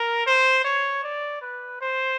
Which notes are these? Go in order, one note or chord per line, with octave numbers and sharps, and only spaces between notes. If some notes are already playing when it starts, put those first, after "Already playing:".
Already playing: A#4
C5
C#5
D5
B4
C5